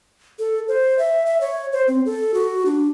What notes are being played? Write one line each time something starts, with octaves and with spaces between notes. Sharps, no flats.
A4
C5
E5
E5
C#5
C5
C4
A4
F#4
D4